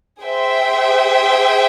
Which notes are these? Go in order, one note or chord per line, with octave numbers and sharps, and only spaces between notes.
G#4 C5 E5 G5